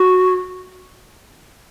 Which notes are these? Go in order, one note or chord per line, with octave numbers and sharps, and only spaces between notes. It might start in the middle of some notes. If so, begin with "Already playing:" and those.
Already playing: F#4